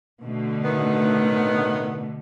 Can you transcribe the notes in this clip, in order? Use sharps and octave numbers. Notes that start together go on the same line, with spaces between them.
B2 D3 A3
A2 D#3 B3